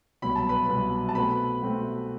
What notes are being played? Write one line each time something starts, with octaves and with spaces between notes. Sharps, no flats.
C2 B2 F#3 B3 B5
A5
B4 B5
C2 B2 F#3 B3
A5
B2 A3 C4 B4 B5
B2 A3 C4